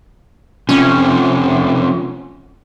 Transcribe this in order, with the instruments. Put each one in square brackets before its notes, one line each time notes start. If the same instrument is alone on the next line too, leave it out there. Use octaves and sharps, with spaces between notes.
[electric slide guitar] C3 F3 A3 [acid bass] C#4